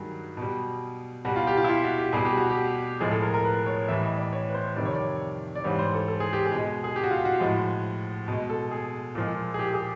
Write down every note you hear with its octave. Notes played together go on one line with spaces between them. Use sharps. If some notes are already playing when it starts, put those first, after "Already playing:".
Already playing: G2 D#3 F#3 G#4
B2 G3
B2 G3 F#4
F4
G4
F4
E4
F4
F#4
G4
B2 G3 G#4
G4
F#4
G4
A2 F3 G#3 G#4
A4
A#4
A#4
B4
C#5
A2 E3 G3 E5
D#5
D5
C#5
B4
C5
F2 C3 D#3 G3 D5
C#5
D5
D5
G#2 E3 G3 C#5
C5
A4
A4
G#4
G4
G#4
B2 G#3
G#4
G4
F#4
F4
F#4
A2 F3 G#3
B2 G#3
A4
G#4
A#2 F3 G#3
G#4
G4
G#4